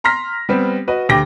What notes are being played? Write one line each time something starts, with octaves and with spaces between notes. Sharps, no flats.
A#5 C6 F6 A#6 B6
G3 B3 C4
F#4 B4 D#5
D2 G4 G5 D6 A#6